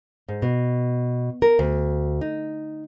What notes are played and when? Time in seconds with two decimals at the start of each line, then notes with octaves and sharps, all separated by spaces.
0.29 G#2
0.42 B2
1.42 A#4
1.59 D2
2.21 D#4